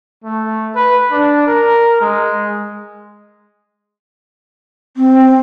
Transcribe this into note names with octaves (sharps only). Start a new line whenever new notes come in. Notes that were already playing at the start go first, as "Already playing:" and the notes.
A3
B4
D4
A#4
G#3
C4